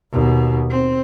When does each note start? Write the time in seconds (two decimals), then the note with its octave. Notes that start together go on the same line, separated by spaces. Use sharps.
0.12 D#2 B2
0.70 C4